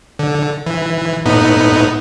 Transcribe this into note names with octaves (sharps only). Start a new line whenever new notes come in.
D3
E3
A2 B3 D#4